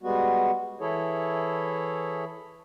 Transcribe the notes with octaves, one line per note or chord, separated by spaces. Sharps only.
G3 G#3 B3 F#4
E3 E4 G#4 A4 C#5